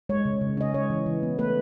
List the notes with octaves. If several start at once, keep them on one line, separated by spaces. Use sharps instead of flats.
G#3 C#5
C#3
C#3
C#4 D#5
G#3 C#5
E3
E3
B3
A3 B4